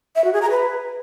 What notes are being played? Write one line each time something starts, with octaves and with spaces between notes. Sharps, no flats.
E5
F#4
G#4
A#5
B4